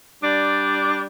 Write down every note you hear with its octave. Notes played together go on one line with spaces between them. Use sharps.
G3 D4